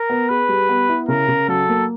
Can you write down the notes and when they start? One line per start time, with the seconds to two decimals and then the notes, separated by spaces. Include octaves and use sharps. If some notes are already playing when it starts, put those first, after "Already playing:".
Already playing: A#4
0.10 B3
0.29 G#4 B4
0.49 G3
0.69 B3
0.89 E4
1.08 C#3 A#4
1.28 C#3
1.48 F#3 A4
1.69 A#3